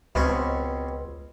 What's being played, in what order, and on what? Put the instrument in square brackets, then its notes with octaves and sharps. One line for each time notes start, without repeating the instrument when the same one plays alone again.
[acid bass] C#2 [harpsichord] B2 C4 C#4